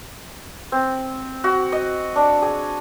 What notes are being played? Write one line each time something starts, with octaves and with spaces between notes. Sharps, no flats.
C4
F#4
D#5
D4
G#4